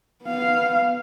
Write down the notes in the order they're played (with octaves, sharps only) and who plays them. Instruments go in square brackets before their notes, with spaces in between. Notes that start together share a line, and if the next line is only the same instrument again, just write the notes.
[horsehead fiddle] B3 F5